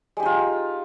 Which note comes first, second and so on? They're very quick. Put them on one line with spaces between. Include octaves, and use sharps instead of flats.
G#3 G4 D#4 F4